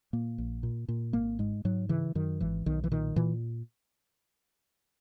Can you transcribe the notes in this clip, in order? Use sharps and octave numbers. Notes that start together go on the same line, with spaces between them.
A#2 A#3
A#1
A#2
A#2
G#1 A#3
G#2 G#3
G#2 F#3
C#3 E3
F#2 D#3
G#1 E3
B1 D#3
E3
A#2 D#3
A#2 E3